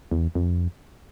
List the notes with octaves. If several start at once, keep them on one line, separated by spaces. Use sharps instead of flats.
E2
F2